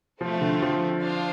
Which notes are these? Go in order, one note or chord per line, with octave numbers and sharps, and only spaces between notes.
F3 A3 C4 F4 A4
D3
F3
D4 F4 C5 F5